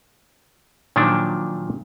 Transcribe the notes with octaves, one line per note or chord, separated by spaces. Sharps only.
A#2 D#3 F3 F#3 D4